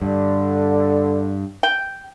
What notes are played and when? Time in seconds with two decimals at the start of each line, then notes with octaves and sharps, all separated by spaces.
0.02 G2 D3
1.63 G5